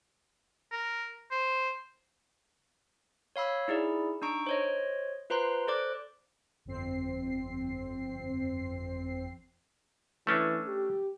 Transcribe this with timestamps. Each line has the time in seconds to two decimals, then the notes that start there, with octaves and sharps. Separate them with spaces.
0.72 A#4
1.31 C5
3.36 C#5 F5 B5 E6
3.68 D#4 E4 G#4 D5
4.22 D4 D#4 A#5 C#6 D7
4.47 C5 C#5 D#5
5.30 F4 B4 C5 A#5 C6
5.67 A4 C5 D5 D6 F#6
6.65 G1 F2 C4 C7
10.27 E3 A3 C#4 D4
10.67 G4